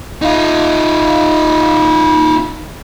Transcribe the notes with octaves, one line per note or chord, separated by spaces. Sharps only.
D#4 F4